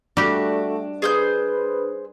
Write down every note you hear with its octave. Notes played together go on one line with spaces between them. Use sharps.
G3 A3 D4 F#4 G4
G#4 B4 C5 G6